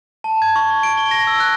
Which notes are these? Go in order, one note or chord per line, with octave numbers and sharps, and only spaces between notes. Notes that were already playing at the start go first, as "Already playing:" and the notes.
A5
G#6
C#6
C#6
D7
G7
A#6
E6
F#6